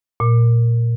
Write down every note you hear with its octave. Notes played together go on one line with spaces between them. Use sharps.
A#2